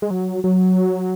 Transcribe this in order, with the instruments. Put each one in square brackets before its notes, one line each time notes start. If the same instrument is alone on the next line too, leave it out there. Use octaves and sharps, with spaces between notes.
[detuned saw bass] G#3
F#3
F#3